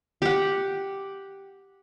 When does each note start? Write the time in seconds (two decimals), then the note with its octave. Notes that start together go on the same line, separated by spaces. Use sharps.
0.22 G4 F#5